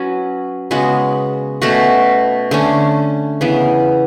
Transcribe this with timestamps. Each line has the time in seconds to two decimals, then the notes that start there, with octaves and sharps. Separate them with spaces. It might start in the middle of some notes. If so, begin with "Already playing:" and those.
Already playing: F#3 C#4 F#4 B4
0.71 C#3 G#3 B3 F#4
1.62 B2 A3 C#4 F#4
2.51 D3 A3 C#4
3.41 C#3 E3 B3